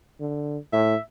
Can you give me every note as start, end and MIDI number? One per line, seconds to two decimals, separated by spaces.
0.20 0.58 50
0.73 0.95 45
0.73 0.99 76